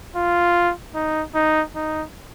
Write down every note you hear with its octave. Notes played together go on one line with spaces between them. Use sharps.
F4
D#4
D#4
D#4